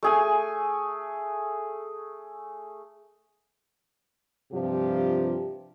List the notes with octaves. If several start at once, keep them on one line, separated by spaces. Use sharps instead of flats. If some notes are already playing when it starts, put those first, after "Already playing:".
A3 G#4 G#5
G2 C3 F3 F4 G4